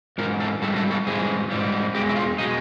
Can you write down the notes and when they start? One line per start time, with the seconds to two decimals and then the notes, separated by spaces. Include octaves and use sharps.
0.18 G#2 E3 A#4
0.40 A4
0.62 G#2 E3 G3 A4
0.76 A4
0.91 A4
1.07 G#2 E3 G3 G#4
1.51 G#2 E3 G3
1.95 E2 B2 G#3 G4
2.09 E4
2.16 F4
2.38 B2 G#3 D#4